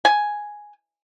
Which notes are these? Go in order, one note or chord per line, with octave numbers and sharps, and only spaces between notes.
G#5